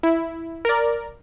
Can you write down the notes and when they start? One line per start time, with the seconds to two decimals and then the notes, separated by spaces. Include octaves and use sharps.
0.03 E4
0.65 A#4 D5